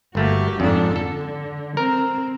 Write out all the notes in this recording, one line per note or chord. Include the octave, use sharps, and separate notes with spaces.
G1 A3 A#3 F#4 G4
F2 G#2 D4 A4
D3 A4
C4 A#4